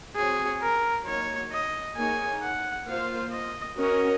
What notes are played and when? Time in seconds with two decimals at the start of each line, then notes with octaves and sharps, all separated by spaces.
0.16 C4 F#4 G#4 C#5
0.62 A#4
1.06 F#3 A#3 D#4 C#5
1.52 D#5
1.97 A#3 D#4 G#4 C#5 G#5
2.42 F#5
2.87 A#3 F4 C5 F5
3.32 D#5
3.78 C#4 F#4 A#4 C#5 D#5